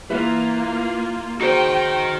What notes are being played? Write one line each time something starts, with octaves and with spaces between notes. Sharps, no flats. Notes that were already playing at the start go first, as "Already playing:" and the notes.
A#3 E4 F4 B4 E5
D#4 F#4 G#4 A#4 C5 G5